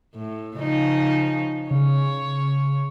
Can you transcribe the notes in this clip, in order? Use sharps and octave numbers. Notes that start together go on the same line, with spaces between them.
A2
C#3 F3 D#4
C#3 C#5